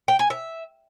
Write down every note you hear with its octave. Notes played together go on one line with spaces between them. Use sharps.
G5
G#5
E5